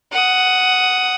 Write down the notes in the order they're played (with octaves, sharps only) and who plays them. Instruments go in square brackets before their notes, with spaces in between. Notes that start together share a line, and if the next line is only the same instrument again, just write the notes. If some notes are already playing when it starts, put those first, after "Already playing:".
[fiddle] F#5 D#6